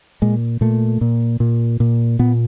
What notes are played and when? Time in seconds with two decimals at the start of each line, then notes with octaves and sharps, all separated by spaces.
0.22 A#2 G#3
0.61 A#2 A3
1.01 A#2
1.40 A#2
1.80 A#2
2.19 A#2 B3